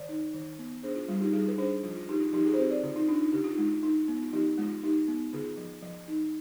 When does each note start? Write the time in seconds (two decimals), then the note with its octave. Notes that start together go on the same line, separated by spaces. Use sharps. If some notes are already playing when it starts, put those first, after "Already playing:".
Already playing: D#3 D5
0.09 D#4
0.34 D#3
0.59 B3
0.83 D4 G#4 C5
0.95 F4
1.08 G3 F4
1.20 D#4 G4
1.33 G3 F4 G#4
1.48 B4
1.58 D4 G#4 C5
1.83 F3 F4
1.96 F4
2.09 D#4 G4
2.20 F4
2.33 F3 D#4 G4
2.46 F4 G#4
2.54 C5
2.58 C4 G4 B4
2.70 B4 D5
2.83 D3 F4
2.96 D#4
3.08 D4 F4
3.21 D#4
3.33 D3 G4
3.44 F4
3.55 G#3 D#4
3.67 F4
3.83 D#4
4.08 B3
4.23 F4
4.33 F3 D#4 G4
4.58 G#3 F4
4.84 D#4 G4
5.08 B3
5.33 D3 F4 G#4
5.57 F3
5.82 F3
6.08 D#4